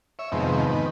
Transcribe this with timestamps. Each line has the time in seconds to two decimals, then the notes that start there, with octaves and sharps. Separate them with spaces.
0.19 C#5 E5
0.32 F2 G#2 C3 D#3 B3
0.66 D#3 B3